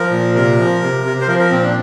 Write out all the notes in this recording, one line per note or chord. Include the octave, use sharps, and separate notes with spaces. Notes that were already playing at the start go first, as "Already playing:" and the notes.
Already playing: F3 A#4
A#2
C3 A#4
F3
C3
C3
C5
F3 A#4
A#4
A#2 C4
D4